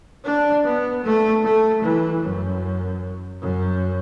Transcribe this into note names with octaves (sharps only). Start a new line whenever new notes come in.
D4
B3
A3
A3
E3
F#2
F#2